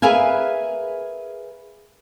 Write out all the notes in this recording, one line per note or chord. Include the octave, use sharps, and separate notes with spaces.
G#4 A#4 B4 E5 F5 G#5